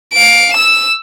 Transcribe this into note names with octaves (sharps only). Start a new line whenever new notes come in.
F5 D7
E6 E7